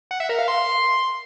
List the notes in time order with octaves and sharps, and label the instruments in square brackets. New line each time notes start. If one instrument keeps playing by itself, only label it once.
[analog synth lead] F#5
E5
A#4
F5
C6